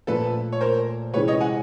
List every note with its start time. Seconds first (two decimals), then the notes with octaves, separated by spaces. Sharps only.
0.07 A#2 F3 A3 A4 B4
0.53 C#5
0.61 A#4 C5
1.14 C3 E3 G#3 C#4 B4 C#5
1.28 C#5 D#5
1.41 F#5 G#5